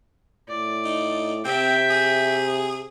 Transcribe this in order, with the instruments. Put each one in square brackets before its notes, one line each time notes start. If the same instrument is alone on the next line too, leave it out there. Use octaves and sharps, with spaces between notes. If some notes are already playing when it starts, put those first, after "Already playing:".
[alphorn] A2 [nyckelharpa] D5
[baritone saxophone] D#4
[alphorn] C3 [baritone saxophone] C4 [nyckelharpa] E5 G5
[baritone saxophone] G#4